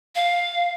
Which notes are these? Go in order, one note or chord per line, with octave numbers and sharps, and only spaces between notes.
F5